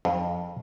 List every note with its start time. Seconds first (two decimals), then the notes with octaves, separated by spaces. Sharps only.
0.05 F2